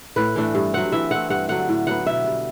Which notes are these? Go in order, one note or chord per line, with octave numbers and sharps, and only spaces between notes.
A2 B4
E3 A3 D4
G2
F#3 C4 F#5
E3 E5
A3 C4 F#5
G2 F#5
D3 F#3 F#5
A2
F#3 B3 F#5
B2 E5
G3 D4